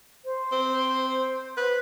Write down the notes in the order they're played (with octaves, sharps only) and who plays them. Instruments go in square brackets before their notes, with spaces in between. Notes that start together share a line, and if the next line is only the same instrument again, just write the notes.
[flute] C5
[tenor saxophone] C4
B4